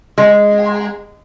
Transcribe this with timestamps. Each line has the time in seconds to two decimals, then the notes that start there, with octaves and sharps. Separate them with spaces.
0.18 G#3